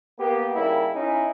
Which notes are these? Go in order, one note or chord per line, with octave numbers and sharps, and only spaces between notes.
A#3 B3 G4
C#3 G3 A#3 D#4 E4 A#4
C#4 D#4 E4